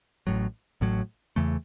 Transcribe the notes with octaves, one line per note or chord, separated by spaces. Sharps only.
A1 A2 F#3
A1 A2 F#3
E2 C#3 E3 A3